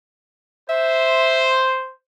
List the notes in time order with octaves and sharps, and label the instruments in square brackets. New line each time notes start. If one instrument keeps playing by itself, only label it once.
[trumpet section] C5 [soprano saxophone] E5